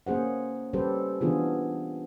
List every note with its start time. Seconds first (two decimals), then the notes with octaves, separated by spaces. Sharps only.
0.07 A#3 C#4 G#4 C5 F#5
0.73 G3 C#4 G4 A4 B4 C5
1.21 E3 B3 D4 F4 G#4